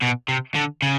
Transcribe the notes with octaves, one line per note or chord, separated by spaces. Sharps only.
B2
C3
D3
C#3